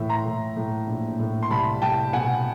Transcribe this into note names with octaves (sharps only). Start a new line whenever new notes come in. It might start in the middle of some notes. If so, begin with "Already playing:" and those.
Already playing: A2 E3 E5
A#5 C6
A2
A2
A#1
A2
C6
C2 A5 B5
C2 G5 A5
B2 F#5 G#5